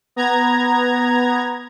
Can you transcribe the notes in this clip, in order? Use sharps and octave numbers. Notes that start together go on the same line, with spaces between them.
B3 A#5 G#6